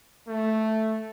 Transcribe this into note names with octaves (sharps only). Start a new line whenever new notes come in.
A3